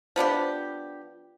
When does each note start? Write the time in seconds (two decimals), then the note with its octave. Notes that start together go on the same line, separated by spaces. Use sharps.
0.16 F3 B3 D4 G4